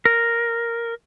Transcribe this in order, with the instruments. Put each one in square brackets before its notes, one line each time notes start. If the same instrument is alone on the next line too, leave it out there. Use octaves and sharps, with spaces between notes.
[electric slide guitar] A#4